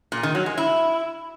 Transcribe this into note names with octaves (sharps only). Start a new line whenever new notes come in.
A#2
D#3
F#3
G#3
E4